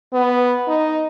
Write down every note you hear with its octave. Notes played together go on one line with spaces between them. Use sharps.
B3
D#4